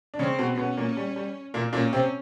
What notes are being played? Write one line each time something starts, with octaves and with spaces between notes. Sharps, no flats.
D4
C#3 C4 C#4
B2 B3
B2 B3 C#4
A#2 A#3
G3
G3
A#2 A#3
A#2 A#3 C#4
C3 C4